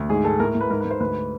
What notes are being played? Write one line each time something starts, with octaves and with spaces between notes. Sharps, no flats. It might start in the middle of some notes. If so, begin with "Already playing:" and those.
Already playing: D2
G#2 G#4
G#3 A4
A2 A#4
A2
B4
G#2 A#4
B4
G#2
C5
D2 B4